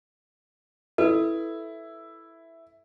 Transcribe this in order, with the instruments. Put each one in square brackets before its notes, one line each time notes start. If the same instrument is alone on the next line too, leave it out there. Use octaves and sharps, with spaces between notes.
[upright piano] E4 [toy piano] A4 B4